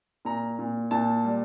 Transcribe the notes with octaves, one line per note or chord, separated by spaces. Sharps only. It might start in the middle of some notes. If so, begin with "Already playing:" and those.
A#2 A#5
A#2
A#2 A5
G3